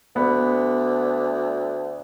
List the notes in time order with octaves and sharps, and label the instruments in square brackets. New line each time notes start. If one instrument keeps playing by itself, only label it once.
[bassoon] D2 [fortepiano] B3